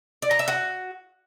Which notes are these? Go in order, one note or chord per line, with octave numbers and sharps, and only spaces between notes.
D5
A#5
E5
F#4